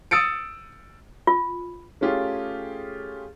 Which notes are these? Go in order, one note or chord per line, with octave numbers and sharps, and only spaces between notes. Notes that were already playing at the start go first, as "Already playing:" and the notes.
D#6 E6 A6 C#7 D7
F4
A3 C#4 F4 G4 G#4